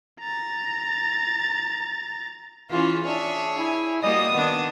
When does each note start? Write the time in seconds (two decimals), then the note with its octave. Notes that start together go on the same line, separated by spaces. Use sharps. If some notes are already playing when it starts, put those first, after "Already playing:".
0.20 A#5 A6
2.70 E3 C#4 F4 G#4
3.06 D4 G#4 C#5 E5
3.58 E4 G#5
4.03 G3 A#3 F#4 D#5 D#6
4.33 D#3 B3 D4